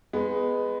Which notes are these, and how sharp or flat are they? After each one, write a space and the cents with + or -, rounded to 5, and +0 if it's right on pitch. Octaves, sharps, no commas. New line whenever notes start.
G#3 +0 B3 +10 D#4 +0